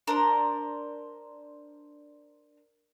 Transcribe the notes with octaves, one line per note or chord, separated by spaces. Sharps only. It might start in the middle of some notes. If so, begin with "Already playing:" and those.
D4 A#4 C5